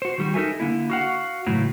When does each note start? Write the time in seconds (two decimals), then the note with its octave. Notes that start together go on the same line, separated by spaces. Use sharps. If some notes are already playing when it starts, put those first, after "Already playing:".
0.02 F#4 C5
0.18 D#3 G3 F#4
0.34 D#4 A4 A#4 E5 G#5
0.60 D3 A#3 E4
0.90 F#4 F5 F#5
1.47 A2 C#3 E3 F#3